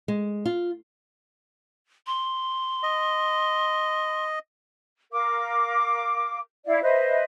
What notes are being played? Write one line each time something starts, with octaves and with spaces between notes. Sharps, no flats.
G#3
F4
C6
D#5
A#4 F5 D6
E4 D5 E5 F5
B4 C5 D#5 E5